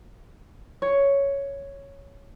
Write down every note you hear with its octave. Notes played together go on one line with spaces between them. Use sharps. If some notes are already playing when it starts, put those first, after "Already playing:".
C#5